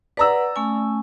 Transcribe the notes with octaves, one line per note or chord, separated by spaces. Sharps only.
B4 D5 F#5 A#5 E6
A3 C#4 G#5